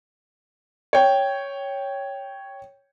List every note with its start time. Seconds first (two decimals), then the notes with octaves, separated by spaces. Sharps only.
0.93 C#5 G5